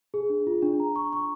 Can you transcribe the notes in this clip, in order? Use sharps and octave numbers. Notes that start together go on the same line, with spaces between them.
G#4
D4
F4
D4
A#5
C#6
C#6